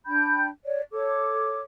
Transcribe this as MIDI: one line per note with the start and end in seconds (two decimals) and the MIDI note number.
0.06 0.48 62
0.06 0.48 79
0.06 0.48 83
0.06 0.48 91
0.64 0.82 73
0.64 0.82 74
0.92 1.61 69
0.92 1.61 73
0.92 1.61 86